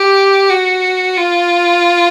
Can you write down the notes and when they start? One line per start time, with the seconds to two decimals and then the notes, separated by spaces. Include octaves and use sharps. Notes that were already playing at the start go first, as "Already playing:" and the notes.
Already playing: G4
0.50 F#4
1.17 F4